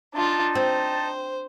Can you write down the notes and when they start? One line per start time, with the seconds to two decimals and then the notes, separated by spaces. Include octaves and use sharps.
0.14 D4 D#4 F4 A5
0.55 C4 C5